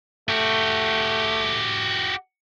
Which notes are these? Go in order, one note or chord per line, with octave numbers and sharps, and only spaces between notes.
A3 F#4 G4